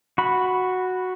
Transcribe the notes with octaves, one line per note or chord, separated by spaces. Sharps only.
F#4 B5